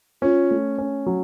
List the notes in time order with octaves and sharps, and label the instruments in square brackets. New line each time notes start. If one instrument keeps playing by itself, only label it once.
[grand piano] C#4 [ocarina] F4
[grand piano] A3
C#4
F#3